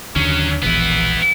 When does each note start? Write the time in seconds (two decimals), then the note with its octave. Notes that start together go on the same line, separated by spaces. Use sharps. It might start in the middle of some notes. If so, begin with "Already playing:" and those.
0.16 D#2 D3 F#3 C#4
0.63 E1 A#1 E2 B3 E4